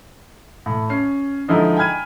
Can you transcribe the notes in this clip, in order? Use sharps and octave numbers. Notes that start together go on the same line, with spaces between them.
A2
C#4 C7
D3 F3 G#3 D#4 E4 A4
G5 G#5 B5 F6 G#6 D#7